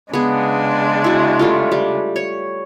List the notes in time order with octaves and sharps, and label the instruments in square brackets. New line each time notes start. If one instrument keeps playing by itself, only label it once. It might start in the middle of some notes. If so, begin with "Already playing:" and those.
[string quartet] C#3 G#3 D4 [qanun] B3 G#4
[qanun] E4 F#4
G3 A3 F4
G3
C#5